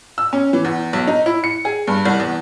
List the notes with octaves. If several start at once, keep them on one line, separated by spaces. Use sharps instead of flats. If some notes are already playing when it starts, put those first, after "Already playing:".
E6
C#4
E3
E2
B1
D#4
E4
C#7
G#4
G2
C2
E2